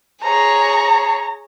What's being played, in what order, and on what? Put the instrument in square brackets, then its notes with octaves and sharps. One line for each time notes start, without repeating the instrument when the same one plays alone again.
[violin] G#4 C#5 [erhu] A#5